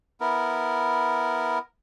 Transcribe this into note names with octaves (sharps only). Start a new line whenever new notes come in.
B3 E4 A#4